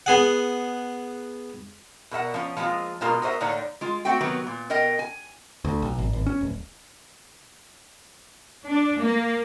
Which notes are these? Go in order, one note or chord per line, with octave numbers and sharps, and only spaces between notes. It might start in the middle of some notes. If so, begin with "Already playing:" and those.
B3 G#4 F#5
B2 A#4 E5 F#5
F3 C#4
F3 G#3 A#3 C4 F4
B2 G#3 A#3 F4 A#4
F#4 A#4 C5 D#5 E5
A2 D3 A#3 D4 D#4 C#5
G#3 F4
A3 C4 F#4 G5
C3 D#3 F#3 B3
A#2
B2 A#4 D#5 G5
G#5
D2
B1
G#1
G#1
C#4
D1
D4
A#3